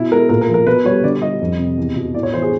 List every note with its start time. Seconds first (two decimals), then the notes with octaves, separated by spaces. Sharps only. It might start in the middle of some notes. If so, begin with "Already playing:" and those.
Already playing: B2 E4
0.11 G#3 A#4
0.29 A#2 A#4
0.41 A#4
0.49 F3
0.54 A#4
0.67 B2 B4
0.85 G3 C#5
1.03 D3 D5
1.22 G3 D#5
1.41 F2
1.59 C3
1.78 E2
1.96 B2
2.14 A2 D5
2.23 C#5
2.33 E3 C5
2.42 G#4